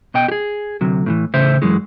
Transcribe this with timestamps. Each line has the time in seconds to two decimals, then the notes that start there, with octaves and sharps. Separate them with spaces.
0.14 B2 D#5 G5
0.28 G4 G#4
0.81 D2 C3 F#3
1.06 A2 D3 E3
1.34 E2 A2 C#3 C5 E5
1.62 F#2 E3 F#3 G#3